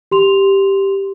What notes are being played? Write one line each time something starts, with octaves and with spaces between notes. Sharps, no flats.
G4 C6 F7